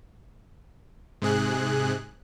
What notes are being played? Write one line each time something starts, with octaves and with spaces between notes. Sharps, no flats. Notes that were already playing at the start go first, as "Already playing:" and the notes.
G#2 C3 G#4 F#6